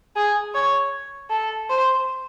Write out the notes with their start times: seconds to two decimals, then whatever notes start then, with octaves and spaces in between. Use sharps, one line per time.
0.16 G#4
0.55 C#5
1.31 A4
1.70 C5